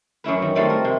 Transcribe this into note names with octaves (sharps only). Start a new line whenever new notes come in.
F#2 C#4 E4 B4
D#3
F3 G3 A3 C4 D#4 F#4
A#4
C3